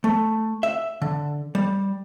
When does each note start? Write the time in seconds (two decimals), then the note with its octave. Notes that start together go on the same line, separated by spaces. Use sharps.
0.04 A3
0.63 E5
1.02 D3
1.55 G3